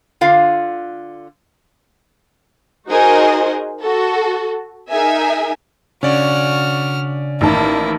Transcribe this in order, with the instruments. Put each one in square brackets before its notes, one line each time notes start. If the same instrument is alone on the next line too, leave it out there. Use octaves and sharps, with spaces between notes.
[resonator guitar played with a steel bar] D3 F4 F5
[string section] D#4 F#4 G#4 A#4 C5 D#5
F#4 A4
D#4 G#4 A#4 E5 G#5
[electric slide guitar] C#3 D4 [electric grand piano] C#4 D5 [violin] F#4 F6
[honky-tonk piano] A1 D#3 A5 [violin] A#3 E4